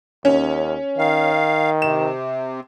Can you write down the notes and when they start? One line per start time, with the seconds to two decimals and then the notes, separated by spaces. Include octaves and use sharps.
0.25 D#2 C#4
0.98 D#3 F5
1.82 C3 E7